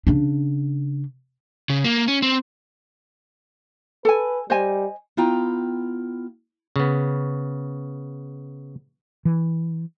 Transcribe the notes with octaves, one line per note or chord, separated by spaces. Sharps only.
C#3 D4
C#3
A#3
C#4
C4
A4 B4 G#5
G3 C5 D#5 G#5
B3 E4 F4 G5 A#5
C#3 B3
E3